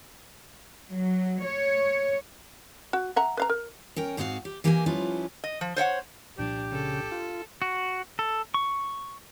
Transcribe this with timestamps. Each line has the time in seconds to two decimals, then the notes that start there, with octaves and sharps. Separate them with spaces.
0.88 F#3
1.44 C#5
2.93 F#4
3.16 E5 F#5 A#5
3.37 B4 F5 A#5
3.50 A#4
3.96 C#4 A#4 G5
4.17 G#2 C4 D#4 F#4 A4 F5
4.45 G4
4.64 E3 A#3 G4 A#4 C5 G#5
4.86 F3 G3 C#4 E4 F4 B4
5.44 D#5
5.61 F3
5.76 C5 C#5 E5 F#5
6.38 C2 A#2 F3 D4 G4
6.72 C#3 A4
7.12 F4
7.62 F#4
8.19 A4
8.54 C#6